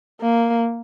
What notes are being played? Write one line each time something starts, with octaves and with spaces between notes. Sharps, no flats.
A#3